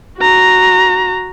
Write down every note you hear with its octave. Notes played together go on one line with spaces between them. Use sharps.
F#4 A#5